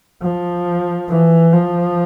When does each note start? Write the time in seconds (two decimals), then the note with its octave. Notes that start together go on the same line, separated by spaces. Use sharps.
0.22 F3
1.09 E3
1.52 F3